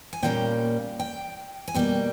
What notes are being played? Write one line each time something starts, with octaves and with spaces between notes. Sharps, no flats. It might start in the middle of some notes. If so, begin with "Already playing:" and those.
G#5
A#2 G3 A#3 C#4 G5
G5
G#5
B2 G3 A#3 G5